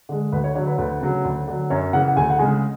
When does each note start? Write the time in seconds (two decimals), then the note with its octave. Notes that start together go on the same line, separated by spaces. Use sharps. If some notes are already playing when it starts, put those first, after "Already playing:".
0.09 D3 G#3
0.32 D2 B4
0.44 C#5
0.55 D3 F#3 C#5
0.67 B4
0.78 D2 B4
1.01 C#3 F#3
1.25 D2
1.48 D3 F#3
1.70 F#2 C#5
1.93 C#3 E3 F#5
2.08 F#5
2.17 D2 G#5
2.30 F#5
2.39 C#3 G#3 G#5